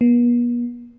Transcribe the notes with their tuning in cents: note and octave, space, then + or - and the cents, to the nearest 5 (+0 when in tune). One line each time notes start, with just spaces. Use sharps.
B3 -45